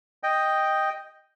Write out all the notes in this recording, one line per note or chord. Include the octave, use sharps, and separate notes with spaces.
D#5 G5